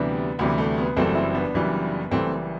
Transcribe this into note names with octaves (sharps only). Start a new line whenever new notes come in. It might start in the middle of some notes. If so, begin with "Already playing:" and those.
Already playing: D2 C3 E3 G3 B3 D4
D2 C3 E3 G3 B3
A3
B3
F#1 F#2 E3 G3 A3 C4
C4 E4
B3 D4
F#1 F#2 E3 G3
F#1 F#2 E3 G3 A3 C4